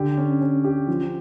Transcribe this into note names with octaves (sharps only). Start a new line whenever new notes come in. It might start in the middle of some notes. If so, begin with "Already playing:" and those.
Already playing: D3 G4
C#4
C#4
G4
F3